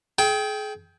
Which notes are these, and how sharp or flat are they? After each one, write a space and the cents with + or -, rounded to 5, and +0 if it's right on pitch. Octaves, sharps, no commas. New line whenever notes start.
G#4 +35 G5 +0